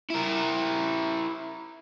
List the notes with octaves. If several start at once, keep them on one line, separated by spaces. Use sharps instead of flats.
E4 A#4